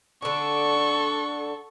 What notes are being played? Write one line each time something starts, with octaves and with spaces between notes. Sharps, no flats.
D3 D4 A4 C#6